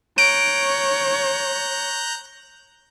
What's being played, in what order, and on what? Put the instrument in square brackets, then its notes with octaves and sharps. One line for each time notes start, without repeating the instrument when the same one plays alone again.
[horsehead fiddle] C#5 [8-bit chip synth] A#5 F#6 G6 [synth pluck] D7